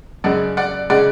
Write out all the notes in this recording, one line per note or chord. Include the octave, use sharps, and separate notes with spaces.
F#2 C#3 G#3 D5 F#5
D5 F#5
C#3 G#3 D5 F#5